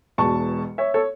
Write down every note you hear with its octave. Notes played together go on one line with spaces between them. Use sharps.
E1 E2 B2 A5 C#6
C#5 E5
A4 C#5